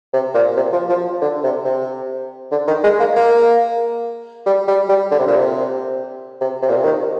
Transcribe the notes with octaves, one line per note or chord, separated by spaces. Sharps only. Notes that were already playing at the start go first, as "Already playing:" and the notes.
C3
A#2
C3
F3
F3
D3
C3
C3
D3
D#3
G#3
A#3
A#3
G3
G3
G3
D3
C3
A#2
C3
C3
C3
A#2
C3
D#3